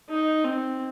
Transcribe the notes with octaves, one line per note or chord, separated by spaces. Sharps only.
D#4
C4